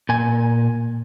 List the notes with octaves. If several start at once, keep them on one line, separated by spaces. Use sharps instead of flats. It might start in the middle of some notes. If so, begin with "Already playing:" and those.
A#2 G#5